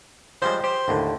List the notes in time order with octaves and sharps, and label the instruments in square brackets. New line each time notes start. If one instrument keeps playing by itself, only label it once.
[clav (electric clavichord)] F3 G3 G#3 [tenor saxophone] C5
[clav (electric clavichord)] G4 [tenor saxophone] C5
[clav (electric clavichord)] D#2 A2 D3